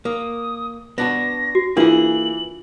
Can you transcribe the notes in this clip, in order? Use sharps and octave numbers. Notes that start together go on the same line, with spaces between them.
A#3 D#6
B3 D4 F#4 A#6
F#4
E3 A#3 D4 F4 G#4 F#7